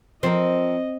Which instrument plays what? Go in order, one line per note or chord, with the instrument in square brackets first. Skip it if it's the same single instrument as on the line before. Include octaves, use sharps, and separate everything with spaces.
[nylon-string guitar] F3 A#4 [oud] C4 [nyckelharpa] D#5